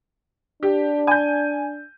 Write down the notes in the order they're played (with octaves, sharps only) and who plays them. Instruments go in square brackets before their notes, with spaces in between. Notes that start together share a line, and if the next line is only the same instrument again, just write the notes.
[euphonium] D4 [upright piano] G4
[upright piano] G#5 G6